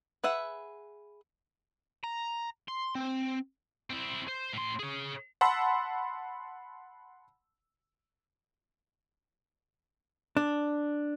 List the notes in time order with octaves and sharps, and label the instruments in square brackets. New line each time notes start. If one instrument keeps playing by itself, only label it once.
[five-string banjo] G#4 B4 E5 F#5
[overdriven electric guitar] A#5
C6
C4
[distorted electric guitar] C4 E4
C5
A2 C6
G#4 C#5
[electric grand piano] F#5 A5 B5 C6 E6
[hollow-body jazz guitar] D4